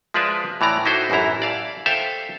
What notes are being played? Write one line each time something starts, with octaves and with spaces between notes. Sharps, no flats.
F3 G#3 F4 B4 D5 E5
A2 E3 D5 A#5
D#4 E4 F#4 A4 C5
A1 F#2 E3 E4 A#5
D5 F5 A5
A4 C5 E5 F5 G5